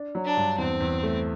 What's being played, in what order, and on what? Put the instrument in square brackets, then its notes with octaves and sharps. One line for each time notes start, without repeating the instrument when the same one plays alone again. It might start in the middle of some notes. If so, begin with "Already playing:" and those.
Already playing: [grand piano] D4
F#3
[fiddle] D4
[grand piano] G2
[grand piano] E2 [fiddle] C4
[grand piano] E2
A3